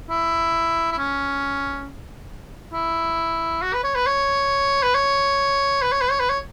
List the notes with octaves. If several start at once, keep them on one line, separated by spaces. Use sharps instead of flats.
E4
E4
C#4
E4
F#4
B4
C#5
B4
C#5
B4
C#5
B4
C#5
B4
C#5
B4
C#5